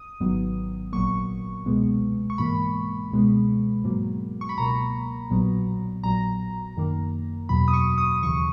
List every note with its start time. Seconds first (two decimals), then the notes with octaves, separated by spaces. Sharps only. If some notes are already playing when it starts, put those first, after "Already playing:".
Already playing: D#6
0.20 G#1 G#2 D#3 F#3 B3
0.93 A#1 A#2 F#3 A#3 C#6
1.66 C#2 B2 G#3 B3
2.30 C#6
2.38 G#2 E3 A#3 B5
3.11 C#2 B2 G#3 B3
3.84 G#2 F#3 A#3
4.41 C#6
4.49 B5
4.57 C#2 B2 A#3 A#5
5.30 A#1 A#2 F#3 B3
6.03 A#1 A#2 F#3 A#5
6.76 F#2 D#3 A#3
7.49 E2 B2 F#3 B5
7.68 D#6
7.73 C#6
7.98 D#6
8.13 D#6
8.22 D#2 C#3 E3 C#6